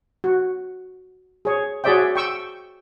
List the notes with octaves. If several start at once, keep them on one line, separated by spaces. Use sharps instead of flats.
F#4
G#4 C#5
F#4 G#4 C#5 D5 E5 G5
G5 C#6 E6